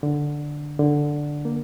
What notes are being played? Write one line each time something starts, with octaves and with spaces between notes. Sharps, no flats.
D3
D3
A#3